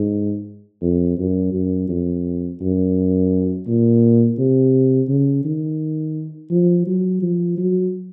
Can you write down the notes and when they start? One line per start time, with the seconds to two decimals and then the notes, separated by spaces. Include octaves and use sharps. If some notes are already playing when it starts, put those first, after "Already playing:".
Already playing: G#2
0.82 F2
1.18 F#2
1.53 F#2
1.89 F2
2.60 F#2
3.67 A#2
4.38 C3
5.08 C#3
5.45 D#3
6.50 F3
6.87 F#3
7.22 F3
7.58 F#3